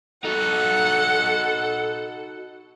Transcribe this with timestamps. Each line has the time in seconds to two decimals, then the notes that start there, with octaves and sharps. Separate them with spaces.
0.25 D#4 F#4 A4 F#5